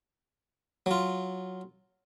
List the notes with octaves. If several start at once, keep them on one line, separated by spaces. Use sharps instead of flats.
F#3 F4